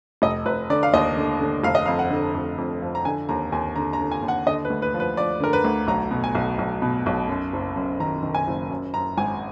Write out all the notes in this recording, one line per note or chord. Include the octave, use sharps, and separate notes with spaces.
F1 D#5
F1 B4
D3 D5
F5
D#2 D#5
D3
D3
F1 F5
D#5
F2 F5
F#5
D3
F2
F2
F3
A#5
D3 G#5
D#2 A#5
D#2 G#5
D3 A#5
A#5
D3
G#5
D#2
F#5
D3 D#5
B4
D2
B4
F3
B4
F3 D5
D3 A#4
B4
D2
B1 A#5
B2
G#5
B1
B1
B2
B1
F#2
F#1
F#2
D#3 A#5
D#3
G#5
F#1
F#2
F#2 A#5
G#1 G#5